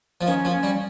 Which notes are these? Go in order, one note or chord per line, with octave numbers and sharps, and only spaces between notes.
F3
D#3 C#4
F3
C#4
G3